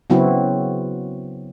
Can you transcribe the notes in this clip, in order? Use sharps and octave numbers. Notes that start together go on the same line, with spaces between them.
C#3 F#3 B3 C4 E4 F#4